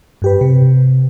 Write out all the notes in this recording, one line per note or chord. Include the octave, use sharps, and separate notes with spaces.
G2 G4 B4
C3